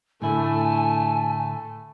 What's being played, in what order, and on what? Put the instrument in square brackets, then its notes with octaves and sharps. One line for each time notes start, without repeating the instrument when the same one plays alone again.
[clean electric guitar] A2 D3 E4 [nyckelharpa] A3 [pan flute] G#5